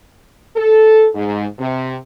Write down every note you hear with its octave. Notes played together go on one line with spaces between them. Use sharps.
A4
G#2
C3